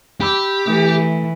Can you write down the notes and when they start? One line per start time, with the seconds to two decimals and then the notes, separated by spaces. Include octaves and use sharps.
0.21 G4 G5 B5 E6
0.67 E3 A3